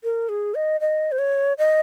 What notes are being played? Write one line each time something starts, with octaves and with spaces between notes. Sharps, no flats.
A#4
G#4
D#5
D#5
C5
C#5
D#5